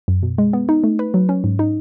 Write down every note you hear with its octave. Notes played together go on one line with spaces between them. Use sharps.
F#2
B2
G#3
B3
D#4
A3
B4
F#3
C#4
G#2
D#4